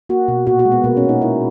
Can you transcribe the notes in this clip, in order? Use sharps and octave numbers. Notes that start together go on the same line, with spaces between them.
A#3 F#4
B2
A#2 F#4
F#4
G#3
B3
B2 A#3
C#4
B2
D#4
A#3 E4